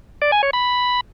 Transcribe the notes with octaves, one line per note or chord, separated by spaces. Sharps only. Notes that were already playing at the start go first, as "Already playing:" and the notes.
D5
G#5
C#5
B5